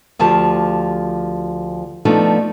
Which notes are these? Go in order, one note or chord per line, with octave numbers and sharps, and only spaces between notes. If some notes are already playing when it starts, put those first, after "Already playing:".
D2 F3 G4 A5
F3 A3 B3 D4 D#4